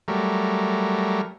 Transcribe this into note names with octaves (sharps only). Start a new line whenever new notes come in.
F#3 G3 A3 A#4